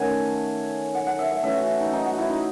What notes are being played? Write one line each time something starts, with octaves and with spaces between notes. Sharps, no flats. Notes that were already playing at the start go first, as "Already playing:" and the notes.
Already playing: D#3 A3 C#4 F#5 G#5
F#5
F#5
E5
E5
E3 A3 C#4 E5
F#4
D#4
D#4
F#4
E4
D#4